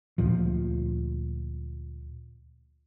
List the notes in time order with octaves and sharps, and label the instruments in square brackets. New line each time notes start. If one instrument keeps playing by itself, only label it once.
[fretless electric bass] D2 A#2 F3